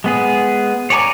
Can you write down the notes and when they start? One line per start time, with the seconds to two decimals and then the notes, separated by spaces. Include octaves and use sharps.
0.04 G#3 B3 G#4
0.90 C#5 D5 G#5 A#5 D6